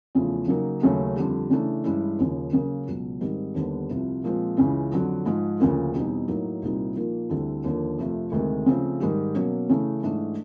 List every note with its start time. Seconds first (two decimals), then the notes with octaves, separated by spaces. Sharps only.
0.15 E2 C#3 F3 A3
0.48 C#3 F#3 A#3 D#4
0.82 D#2 C#3 F#3 A3 C#4
1.16 F2 D3 G3
1.50 C#3 E3 A3 D4
1.84 G2 E3 G#3 C#4 E4
2.19 D#2 C#3 F3
2.53 C#3 F#3 A#3 C#4
2.87 C#2 B2 F#3
3.21 G#2 D#3 G3 C4
3.55 D#2 D3 G3 B3
3.90 C2 C3 F3
4.24 A#2 F3 G#3 C4
4.57 C#2 C#3 E3
4.92 F2 D3 F#3
5.25 G#2 F3 G#3
5.60 D2 C#3 F3 A#3
5.94 E2 B2 G3 C4 D#4
6.28 A2 F#3 A#3 D#4
6.62 C2 A#2 G3 C4 D#4
6.96 A#2 F3 A#3 D#4
7.30 D2 D3 G3 C4 E4
7.64 D#2 D3 F3 A#3 D4
7.98 F2 C3 F3 A3
8.32 D2 C3 D#3 G#3
8.66 C#3 F3 A3 C4
9.00 G#2 D#3 G3
9.35 B2 F#3 A#3 C#4
9.69 C#3 E3 A3
10.03 G#2 E3 A3 D4